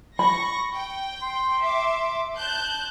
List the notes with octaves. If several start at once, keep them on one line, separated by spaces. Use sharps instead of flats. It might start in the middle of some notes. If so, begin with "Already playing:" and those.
B5 C#6 A#6
G5
C6
E5 D6
A5 F#6 G6